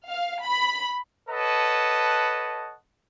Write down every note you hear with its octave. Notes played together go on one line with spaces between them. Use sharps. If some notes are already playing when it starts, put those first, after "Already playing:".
F5
B5
A4 B4 C#5 D#5 F#5 A5